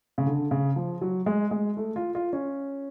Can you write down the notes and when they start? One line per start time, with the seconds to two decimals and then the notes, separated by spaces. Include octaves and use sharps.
0.18 C#3
0.26 D3
0.51 C#3
0.76 F3
1.01 F#3
1.26 G#3
1.51 G#3
1.77 A3
1.96 F4
2.15 F4
2.33 C#4